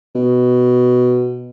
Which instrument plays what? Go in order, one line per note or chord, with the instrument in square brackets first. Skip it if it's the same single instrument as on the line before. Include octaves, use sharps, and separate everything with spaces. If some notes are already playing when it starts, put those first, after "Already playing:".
[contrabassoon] B2